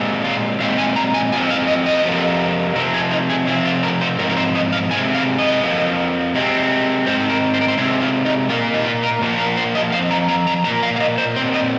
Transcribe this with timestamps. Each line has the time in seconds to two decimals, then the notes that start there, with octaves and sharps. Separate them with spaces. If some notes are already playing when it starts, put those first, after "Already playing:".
Already playing: A#2 G#3 C4
0.24 F4
0.60 A#2 G#3 C4 F5
0.78 G#5
0.96 A#5
1.14 G#5
1.32 C3 F3 G#3 C4 G#5
1.50 F5
1.67 D#5
1.86 D#5
2.04 F2 C3 F3 A#3
2.76 C3 F3 C4 A#4
2.94 G#4
3.11 D#4
3.29 G#4
3.47 C3 F3 C4 G#4
3.65 F4
3.83 A#4
4.01 C5
4.19 G#2 F3 C4 A#4
4.29 A#4
4.37 C5
4.55 D#5
4.72 F5
4.91 C3 G#3 C4 G#5
5.15 F5
5.38 D#5
5.63 F2 F3 A#3
6.34 C3 G#3 C4
7.06 G#2 G#3 C4 C5
7.30 A#4
7.54 C5
7.61 A#4
7.68 C5
7.78 C3 G#3 C4 G#4
8.01 F4
8.25 D#4
8.49 A#2 A#3 F4
8.74 D#4
8.85 F4
9.03 A#4
9.21 A#2 F3 A#3
9.39 A#4
9.57 C5
9.75 D#5
9.92 F2 F3 F5
10.11 A#5
10.29 A#5
10.47 A#5
10.64 A#2 A#3 A#5
10.83 F5
10.96 F5
11.00 D#5
11.18 C5
11.36 A#2 G#3 C4 C5
11.54 D#5